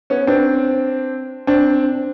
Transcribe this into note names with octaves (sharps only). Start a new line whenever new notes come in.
B3 C#4
C4 D4
C4 D4